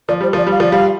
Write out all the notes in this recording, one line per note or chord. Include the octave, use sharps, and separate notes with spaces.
F3 D5
G3 C5
F3 D5
G3
F5
F3 D5
G3 F5